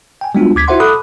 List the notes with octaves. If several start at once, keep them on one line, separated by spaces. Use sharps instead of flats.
G5 G#5
G3 G#3 B3 D4 F4 F#4
D2 D6 G#6 B6
E4 F#4 C5 E5 F#5 C6
A4 B5 D6 D#6 F#6